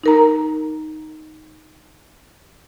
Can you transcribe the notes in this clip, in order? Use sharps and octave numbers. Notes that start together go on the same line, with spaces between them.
D#4 A#4 A#5